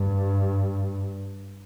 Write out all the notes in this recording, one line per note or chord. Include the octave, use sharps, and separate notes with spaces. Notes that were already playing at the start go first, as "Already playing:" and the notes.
Already playing: G2